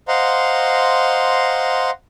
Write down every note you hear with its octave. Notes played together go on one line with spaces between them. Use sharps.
C5 D#5 F5 F#5 A#5 C6